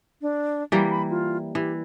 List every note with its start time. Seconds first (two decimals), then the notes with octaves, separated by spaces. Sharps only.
0.22 D4
0.72 E3 G3 A#3
0.90 B5
1.10 F4
1.55 E3 G4